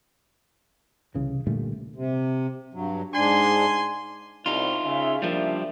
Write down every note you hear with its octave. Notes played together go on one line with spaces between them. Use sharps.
C2 C#3 E3
A#2 D3 G3 A3
C3
G2 F#3
G#2 D4 G#5 C6
C2 D#4 F4
C#3 E5
F3 G3 A#3 D4 E5